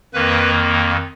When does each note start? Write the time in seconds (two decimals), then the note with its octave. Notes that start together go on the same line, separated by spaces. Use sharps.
0.14 F2 D#3 A#3 B4